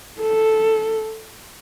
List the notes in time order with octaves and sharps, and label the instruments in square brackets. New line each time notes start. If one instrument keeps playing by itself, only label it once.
[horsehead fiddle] A4